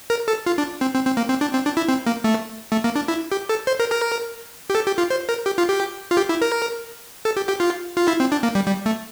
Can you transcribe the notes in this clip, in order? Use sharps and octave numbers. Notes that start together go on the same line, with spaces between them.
A#4
A4
F4
D4
C4
C4
C4
A#3
C4
D4
C4
D4
E4
C4
A#3
A3
A3
A#3
D4
E4
G4
A4
C5
A#4
A#4
G4
A4
G4
F4
C5
A#4
G4
F4
G4
F4
G4
E4
A#4
A4
G4
G4
F4
F4
E4
C4
D4
A#3
G3
G3
A3